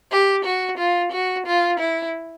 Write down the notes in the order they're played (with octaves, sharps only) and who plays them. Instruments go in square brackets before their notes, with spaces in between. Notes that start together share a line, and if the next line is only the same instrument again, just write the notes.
[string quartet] G4
F#4
F4
F#4
F4
E4